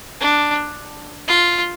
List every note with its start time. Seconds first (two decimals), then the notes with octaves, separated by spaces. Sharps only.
0.20 D4
1.28 F4